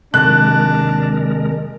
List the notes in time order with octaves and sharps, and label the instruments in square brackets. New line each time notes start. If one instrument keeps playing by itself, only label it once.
[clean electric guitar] D#2 C3 [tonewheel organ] G#3 A#4 [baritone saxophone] D4 [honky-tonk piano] F#6